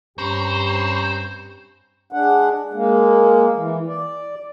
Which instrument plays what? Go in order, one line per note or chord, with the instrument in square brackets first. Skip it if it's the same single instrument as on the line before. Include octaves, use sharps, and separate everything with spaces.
[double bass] G2 [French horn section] C4 C#4 G4 [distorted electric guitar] C5 [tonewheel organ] A#5 B5 C#6
[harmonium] G#3 D4 F#5
G#3 A#3
E3
D5